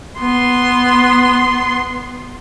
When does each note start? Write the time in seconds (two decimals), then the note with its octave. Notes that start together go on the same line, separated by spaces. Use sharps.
0.20 B3 C6